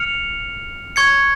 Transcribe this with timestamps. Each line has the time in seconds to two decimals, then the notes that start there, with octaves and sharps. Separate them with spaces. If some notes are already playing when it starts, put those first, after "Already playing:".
Already playing: F6 C#7 F7
0.96 C#6 G#6 C#7